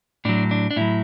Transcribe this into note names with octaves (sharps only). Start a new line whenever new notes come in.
A2 F#3 D4
D4
D4
A2 F#3 E4